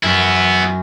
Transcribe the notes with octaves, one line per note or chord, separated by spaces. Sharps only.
F#2 B3 E4